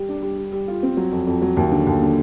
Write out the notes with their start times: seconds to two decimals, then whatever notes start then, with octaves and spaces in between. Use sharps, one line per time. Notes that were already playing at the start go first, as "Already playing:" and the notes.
Already playing: G3 G4
0.09 D4
0.22 G3
0.38 G3
0.53 G3
0.68 F4
0.83 C4
0.97 F#3
1.12 F2
1.27 F2
1.42 F#3
1.57 D#2
1.71 D3
1.87 D#2
2.01 D3